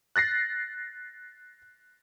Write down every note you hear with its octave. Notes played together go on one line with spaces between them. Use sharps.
F#6 A6 A#6 C7